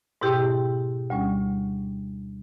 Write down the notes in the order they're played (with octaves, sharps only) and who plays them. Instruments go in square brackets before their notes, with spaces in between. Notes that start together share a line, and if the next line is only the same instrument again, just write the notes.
[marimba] G#2 B2 E4 G4 G5 C6
D2 G3 C#4